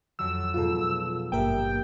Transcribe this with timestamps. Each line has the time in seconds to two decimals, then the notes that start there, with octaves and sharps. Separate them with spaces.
0.19 F2 F#3 E6
0.54 G#2 B2 B3 F4 A4
1.32 G#1 G2 A#3 A#4 E5 G5 D#6